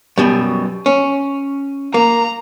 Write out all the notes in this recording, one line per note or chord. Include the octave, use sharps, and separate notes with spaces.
F#2 B2 G3
C#4
A#3 A#5